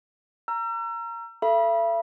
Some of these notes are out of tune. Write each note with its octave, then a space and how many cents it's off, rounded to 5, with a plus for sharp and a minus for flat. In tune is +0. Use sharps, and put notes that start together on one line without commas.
A#5 +0 E6 +40
A4 +0 E5 +45 B5 -30